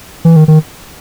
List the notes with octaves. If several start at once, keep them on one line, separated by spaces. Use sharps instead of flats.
E3
D#3
D#3